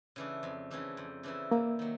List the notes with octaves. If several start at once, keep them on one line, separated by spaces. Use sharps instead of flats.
C#3 E3 A3 D4
F2
C#3 E3 A3 D4
F2
C#3 E3 A3 D4
C3 A#3
D#3 F#3